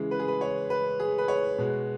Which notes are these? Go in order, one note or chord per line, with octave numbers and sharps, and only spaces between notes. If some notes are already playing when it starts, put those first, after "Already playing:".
Already playing: C#3 E3 G#3
B4
G#4
B4
C#5
B4
G#4
B4
C#5
B2 G#3